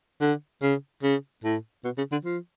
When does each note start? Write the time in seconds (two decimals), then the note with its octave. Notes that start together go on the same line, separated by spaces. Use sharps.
0.21 D3
0.62 C#3
1.03 C#3
1.44 A2
1.84 B2
1.97 C#3
2.12 D3
2.25 F3